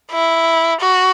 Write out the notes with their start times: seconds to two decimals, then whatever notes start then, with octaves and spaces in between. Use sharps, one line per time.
0.11 E4
0.80 F#4